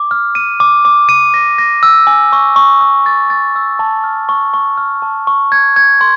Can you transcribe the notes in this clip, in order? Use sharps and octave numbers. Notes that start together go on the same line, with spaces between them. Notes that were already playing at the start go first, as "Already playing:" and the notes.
Already playing: D6
F6
D#7
D6
D6
D#7
A#6
A#6
E6
G#5
C#6
C#6
E6
A6
A6
E6
A5
F6
C#6
C#6
F6
A5
C#6
G#6
G#6
C6